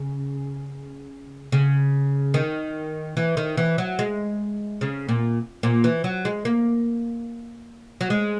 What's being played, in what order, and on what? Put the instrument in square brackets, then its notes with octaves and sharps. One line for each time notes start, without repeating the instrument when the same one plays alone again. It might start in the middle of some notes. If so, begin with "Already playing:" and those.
Already playing: [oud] C#3
C#3
D#3
E3
D#3
E3
F#3
G#3
C#3
A#2
A#2
E3
F#3
G#3
A#3
F#3
G#3